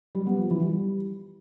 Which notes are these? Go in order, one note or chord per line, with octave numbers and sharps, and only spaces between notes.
G3
B3
F3
E3
G3